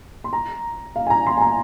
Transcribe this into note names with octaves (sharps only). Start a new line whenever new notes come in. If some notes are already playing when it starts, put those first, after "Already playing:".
C6
A#5
F5
G#5
A#5
C6
G#5
A#5